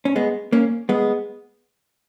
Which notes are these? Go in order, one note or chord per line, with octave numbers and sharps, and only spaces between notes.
C#4
G#3 B3
A#3 C#4
G#3 B3